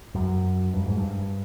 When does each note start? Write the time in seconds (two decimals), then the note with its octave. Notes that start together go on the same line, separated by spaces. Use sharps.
0.15 F#2
0.74 G2
0.86 G#2
0.98 G2